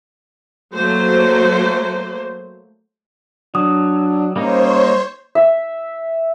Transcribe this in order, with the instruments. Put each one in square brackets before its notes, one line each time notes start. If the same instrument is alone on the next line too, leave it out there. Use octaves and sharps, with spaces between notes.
[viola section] F#3 A3 A#3 C5
[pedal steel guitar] F#3 [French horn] D4 [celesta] D#6
[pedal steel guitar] G3 A#3 D#4 [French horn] C#4 [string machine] C5 C#5
[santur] E5